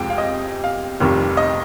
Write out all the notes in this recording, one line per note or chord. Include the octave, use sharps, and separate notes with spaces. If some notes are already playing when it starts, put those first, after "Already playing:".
Already playing: F2 C3 F3 G#3 G5
F5
D#5
F5
F1 F2 D#3 G3
D#5